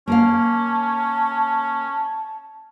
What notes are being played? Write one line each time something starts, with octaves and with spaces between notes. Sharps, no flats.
A#3 C#4 A#4 F5 A5